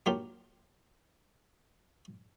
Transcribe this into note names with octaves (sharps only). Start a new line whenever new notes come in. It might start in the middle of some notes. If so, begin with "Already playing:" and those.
F#3 A#3 D4 F4 G4